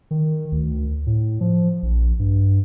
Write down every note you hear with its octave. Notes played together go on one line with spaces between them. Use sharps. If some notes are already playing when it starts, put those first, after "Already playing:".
D#3
D2
A2
F3
A#1
G2